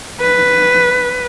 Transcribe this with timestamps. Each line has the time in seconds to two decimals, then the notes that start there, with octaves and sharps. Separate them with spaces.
0.21 B4